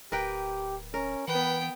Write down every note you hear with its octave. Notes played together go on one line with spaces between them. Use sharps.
D1 G4 A#4 B4 G5
C#4 A#4
E3 B3 B4 G5